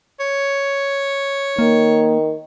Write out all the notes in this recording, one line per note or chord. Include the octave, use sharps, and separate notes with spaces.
C#5
D#3 A#3